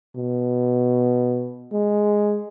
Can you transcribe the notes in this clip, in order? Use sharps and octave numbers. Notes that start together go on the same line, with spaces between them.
B2
G#3